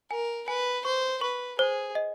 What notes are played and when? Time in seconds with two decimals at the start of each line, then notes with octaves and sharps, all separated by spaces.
0.11 A#4 G#5
0.48 B4 G#5
0.85 C5 C#6
1.21 B4 C#6
1.58 G#4 C5
1.95 D#5